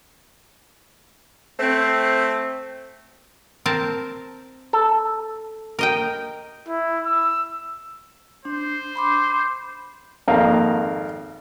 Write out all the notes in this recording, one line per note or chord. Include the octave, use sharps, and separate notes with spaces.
A3 C4
C4 A#4 A5
A4
A#4 D#5 G5
E4
E6
D4 C5
B5 C6 D6
G#1 F2 A#3 F5 F#5